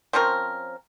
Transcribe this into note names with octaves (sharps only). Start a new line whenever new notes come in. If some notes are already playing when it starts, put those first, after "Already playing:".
F3 C4 C#4 A#4